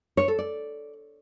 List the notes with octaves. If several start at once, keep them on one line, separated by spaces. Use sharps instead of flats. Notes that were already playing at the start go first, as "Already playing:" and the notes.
C#5
A4
D5